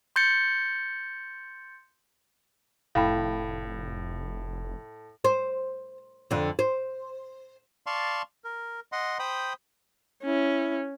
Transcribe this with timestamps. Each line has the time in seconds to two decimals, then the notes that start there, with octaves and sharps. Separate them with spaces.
0.16 C6 G6 A6 C#7
2.95 F1 A2 F5 G5 B5
5.24 C5
6.31 F2 D3
6.59 C5
7.87 D5 F5 A5 C6 C#6
8.44 A#4
8.92 D#5 F#5 C6
9.19 C5 G5 B5 D#6
10.24 C#4 E4